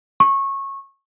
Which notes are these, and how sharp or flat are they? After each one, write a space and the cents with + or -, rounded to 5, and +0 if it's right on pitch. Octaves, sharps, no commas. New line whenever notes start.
C#6 -20